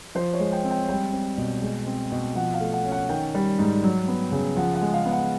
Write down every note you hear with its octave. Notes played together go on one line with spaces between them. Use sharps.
F3 C5
C#5
G#3
G5
C4
G5
G3 G5
C4
B2
G#3
C4
B2
F3 F#5
F5
A3
F#5
C#4
F#5
D#3 G5
G3
G#2
F#3
B3
C#3
F3 F#5
F#5
G#3
F5
B3
F#5